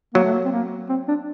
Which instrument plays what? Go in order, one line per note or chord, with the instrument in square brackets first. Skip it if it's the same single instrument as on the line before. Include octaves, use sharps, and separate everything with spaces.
[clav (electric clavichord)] F#3 [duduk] A#3
[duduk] A3
A#3
C4
A#3
C4
D4